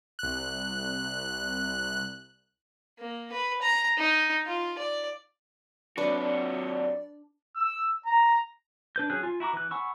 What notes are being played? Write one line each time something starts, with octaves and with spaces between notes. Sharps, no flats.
C2 F#6
A#3
B4
A#5
D#4
F4
D5
C3 F#3 D4 F#4 B4 D5
E6
A#5
D4 B4 G6
F#3 C#4 G#4 F#6
F4 G#5
E4 F#4 A#5 D6
E3 F#6
F#5 G#5 B5 C#6 E6